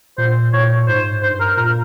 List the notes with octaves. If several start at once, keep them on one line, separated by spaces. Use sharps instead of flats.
A#2 C5
A#2 C#5
G#2 C5
G2 C5
A#4
A#2 A#4